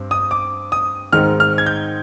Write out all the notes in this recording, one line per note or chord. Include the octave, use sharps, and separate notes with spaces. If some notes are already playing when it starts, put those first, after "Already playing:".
Already playing: G2 C4
D#6
D6
D#6
G#2 D#3 G#3 C4 F6
F6
G#6
G6